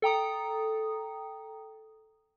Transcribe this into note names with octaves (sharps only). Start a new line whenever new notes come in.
A4 G5 A#5 D#6